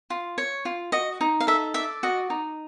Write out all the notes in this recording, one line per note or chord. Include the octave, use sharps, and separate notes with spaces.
F4
C#5
F4
F#4 D#5
D#4
F5
A4 E5
D5 E5
F#4 D#5
D#4